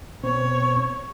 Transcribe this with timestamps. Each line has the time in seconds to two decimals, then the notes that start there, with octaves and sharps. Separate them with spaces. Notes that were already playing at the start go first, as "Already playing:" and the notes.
0.23 B2 C4 C#5